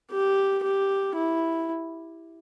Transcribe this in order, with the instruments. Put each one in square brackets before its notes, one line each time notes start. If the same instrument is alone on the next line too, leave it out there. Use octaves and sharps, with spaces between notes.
[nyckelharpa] G4
G4
E4